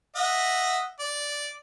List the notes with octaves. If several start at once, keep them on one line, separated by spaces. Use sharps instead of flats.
D#5 E5 F#5
D5